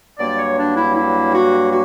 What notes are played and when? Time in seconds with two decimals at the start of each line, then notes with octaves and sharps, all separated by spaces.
0.19 G2 F#3 A#3 D5
0.38 C#5
0.57 D4
0.75 E4
0.94 E4
1.32 F#4
1.70 F#4